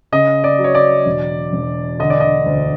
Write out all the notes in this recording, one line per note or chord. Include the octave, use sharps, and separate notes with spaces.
C#3 D#5
D5
F#3
C#5
D5
E1
E1
D3 D#5
D5
D#5
D2